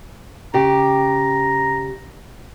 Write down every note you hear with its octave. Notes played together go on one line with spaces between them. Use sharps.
C#3 G4 A#5